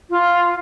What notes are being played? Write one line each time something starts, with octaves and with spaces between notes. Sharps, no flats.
F4